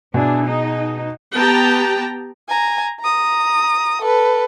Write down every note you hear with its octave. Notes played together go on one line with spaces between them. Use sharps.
B2 D4 E4 G#4 G#5
D#4 G#4
B3 G4 G5 A5 A#5
G#5 A#5
A#5 D#6
A4 B4